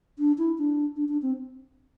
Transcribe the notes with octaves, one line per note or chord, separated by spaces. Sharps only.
D4
E4
D4
D4
D4
C4